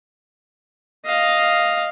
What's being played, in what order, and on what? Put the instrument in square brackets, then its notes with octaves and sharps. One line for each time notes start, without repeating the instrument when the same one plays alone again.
[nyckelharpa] D#5 F5